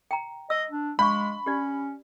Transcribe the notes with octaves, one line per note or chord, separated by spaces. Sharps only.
G5 A#5
D#5 E6
D4
G#3 D4 F5 B5 C#6
C#4 G4 D5